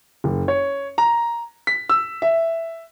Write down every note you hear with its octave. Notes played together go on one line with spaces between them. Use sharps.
F#1
C#5
A#5
B6
E6
E5